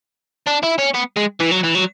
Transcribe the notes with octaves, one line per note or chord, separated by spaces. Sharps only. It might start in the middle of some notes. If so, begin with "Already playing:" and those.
D4
E4
C#4
B3
G#3
E3
F#3
E3
F#3